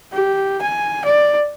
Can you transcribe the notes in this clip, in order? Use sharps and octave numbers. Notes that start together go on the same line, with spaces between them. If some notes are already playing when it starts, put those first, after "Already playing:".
G4
G#5
D5